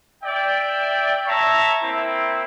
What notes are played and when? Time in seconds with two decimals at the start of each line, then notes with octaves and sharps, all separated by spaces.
0.23 D5 E5 G5
1.26 C#5 E5 A5 A#5 C#6
1.82 A#3 C4 E4